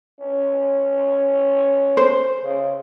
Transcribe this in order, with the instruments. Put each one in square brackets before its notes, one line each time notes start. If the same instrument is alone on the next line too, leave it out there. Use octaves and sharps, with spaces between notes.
[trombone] C#4
[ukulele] C5
[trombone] C#3